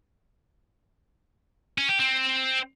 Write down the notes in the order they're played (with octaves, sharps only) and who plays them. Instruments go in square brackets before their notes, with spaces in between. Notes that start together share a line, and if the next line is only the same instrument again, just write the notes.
[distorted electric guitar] C#4
G4
C4